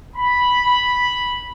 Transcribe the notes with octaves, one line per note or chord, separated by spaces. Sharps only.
B5